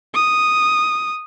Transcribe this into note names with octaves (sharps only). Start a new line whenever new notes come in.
D#6